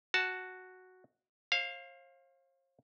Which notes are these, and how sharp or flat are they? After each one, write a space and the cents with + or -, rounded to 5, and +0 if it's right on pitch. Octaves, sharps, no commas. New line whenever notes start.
F#4 +0 A5 +0
C5 +45 F5 +0